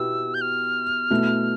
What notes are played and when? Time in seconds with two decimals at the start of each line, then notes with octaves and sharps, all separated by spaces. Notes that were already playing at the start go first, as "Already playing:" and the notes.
Already playing: B2 B3 E4 G4 E6
0.34 G6
0.41 F6
1.10 B2 A3 E4